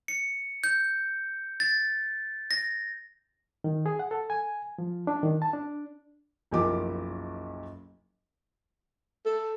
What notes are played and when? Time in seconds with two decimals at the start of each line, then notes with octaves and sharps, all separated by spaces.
0.08 C#7
0.64 G6
1.60 A6
2.51 A#6
3.64 D#3
3.86 G#4
3.99 F#5
4.11 A4
4.30 G#5
4.78 F3
5.07 D4
5.23 D#3
5.42 A5
5.53 D4
6.51 F#1 B1 F3 G4 A#4 D6
9.25 A4